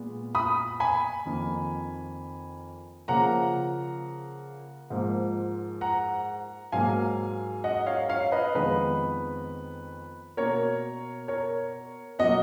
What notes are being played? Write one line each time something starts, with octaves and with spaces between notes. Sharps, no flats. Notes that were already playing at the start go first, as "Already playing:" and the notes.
Already playing: A#2 G#3 B3
B5 D#6
G#5 B5
F2 D#3 A#3
C#3 F3 A#3 F#5 A#5
G#2 F3 A#3
F#5 A#5
G#2 F#3 A#3 F5 G#5
D#5 F#5
C#5 F5
C#5 F5
B4 D#5
F2 D#3 G#3 B3 B4
B2 A#3 A#4 C#5
A#4 C#5
B2 F#3 A#3 D#5 F#5